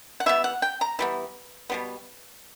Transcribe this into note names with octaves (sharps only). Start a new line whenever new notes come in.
F#5
E3 G3 B3 E5
F#5
G5
A#5
E3 G3 B3
B2 G3 B3